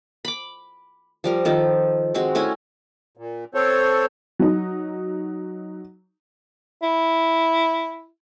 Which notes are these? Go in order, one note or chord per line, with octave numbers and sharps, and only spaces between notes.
B5 D6
F3 G3 A#4
D#3 F3 A4
G#3 C4 F#4
A3 C#4 E4 G#5
A#2
C4 A4 C5 C#5
F#3 D#4
E4